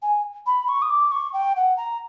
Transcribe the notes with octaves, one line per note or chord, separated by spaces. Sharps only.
G#5
B5
C#6
D#6
D6
C#6
G5
F#5
A#5